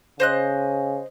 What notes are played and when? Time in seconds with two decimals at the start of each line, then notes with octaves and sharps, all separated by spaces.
0.20 C#3 C5 D#5 F#6